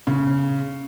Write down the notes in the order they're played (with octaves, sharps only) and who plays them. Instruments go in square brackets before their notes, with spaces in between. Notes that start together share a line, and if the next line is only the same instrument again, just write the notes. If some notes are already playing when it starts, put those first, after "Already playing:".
[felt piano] C#3